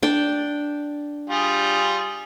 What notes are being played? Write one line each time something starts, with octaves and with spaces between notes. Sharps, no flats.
D4 D5 G5
G3 F4 G#4